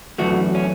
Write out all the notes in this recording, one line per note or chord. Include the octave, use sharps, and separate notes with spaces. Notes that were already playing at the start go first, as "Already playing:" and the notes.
F#2 E3 A3 F#4
C#4